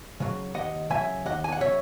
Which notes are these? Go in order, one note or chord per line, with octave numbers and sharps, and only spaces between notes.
C#3 F#3
D#2 D#5 F#5
C#3 F#3 E5 G#5
D#2 D#5 F#5
G#5
F#5
C#3 F#3 C#5 E5